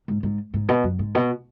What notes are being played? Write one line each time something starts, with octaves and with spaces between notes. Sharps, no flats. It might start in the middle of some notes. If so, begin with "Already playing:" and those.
G#2
G#2
G#2
B2
F#2
G#2
B2